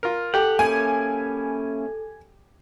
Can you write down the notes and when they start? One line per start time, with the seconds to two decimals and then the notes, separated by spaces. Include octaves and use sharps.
0.03 F4 A#4
0.34 G4 A4 F#5 G5
0.59 A#3 C#4 E4 G#5